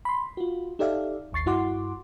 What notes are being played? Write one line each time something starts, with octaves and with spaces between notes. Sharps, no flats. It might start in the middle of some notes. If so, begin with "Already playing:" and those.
B5 C6
F4 F#4
D#4 G4 A4 D5 E5 F5
G#1 D#2 C#6 A6 C7
G2 E4 F#4 F#5 C6 D6